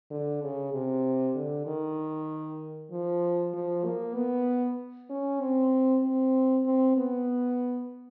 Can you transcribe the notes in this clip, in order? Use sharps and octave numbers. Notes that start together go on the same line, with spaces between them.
D3
C#3
C3
D3
D#3
F3
F3
A#3
B3
C#4
C4
C4
C4
B3